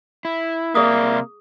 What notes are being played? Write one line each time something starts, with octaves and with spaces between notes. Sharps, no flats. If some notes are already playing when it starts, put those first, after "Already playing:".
E4
C3 A#3 G#4 D5 E5 D#6